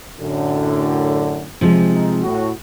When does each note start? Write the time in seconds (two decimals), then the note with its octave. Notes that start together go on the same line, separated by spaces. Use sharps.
0.20 F#2 A2 D3
1.61 C3 F3 G#3
1.91 D#4
2.23 A2 F#4